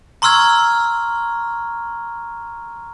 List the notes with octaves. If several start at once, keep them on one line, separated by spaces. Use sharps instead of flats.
A#5 C6 C#6 E6 F6 G#6